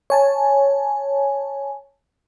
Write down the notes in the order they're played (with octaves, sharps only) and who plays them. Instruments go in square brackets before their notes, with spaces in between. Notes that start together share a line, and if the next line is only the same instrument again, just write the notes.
[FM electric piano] C#5 G#5 A5